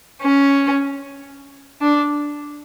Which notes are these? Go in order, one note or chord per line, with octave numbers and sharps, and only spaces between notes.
C#4
D4